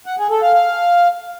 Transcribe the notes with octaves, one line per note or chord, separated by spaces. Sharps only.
F#5
G#4
A4
F5
F5